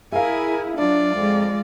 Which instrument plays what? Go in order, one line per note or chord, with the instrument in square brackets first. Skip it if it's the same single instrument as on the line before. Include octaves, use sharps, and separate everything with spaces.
[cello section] E4 G#4 [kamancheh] A#4 G#5 [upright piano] E5 F5
[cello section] F#3 [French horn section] D4 [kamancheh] F4 D5
[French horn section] F2 [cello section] G#3